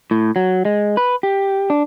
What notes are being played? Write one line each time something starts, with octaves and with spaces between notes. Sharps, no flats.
A2
F#3
G#3
B4
G4
D4